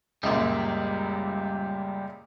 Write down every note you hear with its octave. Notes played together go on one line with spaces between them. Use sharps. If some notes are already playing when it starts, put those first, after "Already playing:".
C#2 F#2 A#2 G3 D5